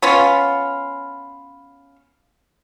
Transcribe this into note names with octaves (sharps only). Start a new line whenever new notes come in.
B3 C#4 F4